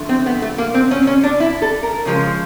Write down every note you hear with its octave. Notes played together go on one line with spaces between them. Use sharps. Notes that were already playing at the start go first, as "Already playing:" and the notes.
Already playing: D3 F3 A3
C4
B3
A3
A#3
C4
C#4
C4
C#4
D4
E4
A4
A#4
C#3 F3 G#3